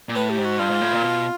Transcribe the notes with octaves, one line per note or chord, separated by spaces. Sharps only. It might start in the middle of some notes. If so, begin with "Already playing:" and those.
A#2
A2 B4
G4
G#2
F#4
G2 F4
G#2
A2
A#2
B2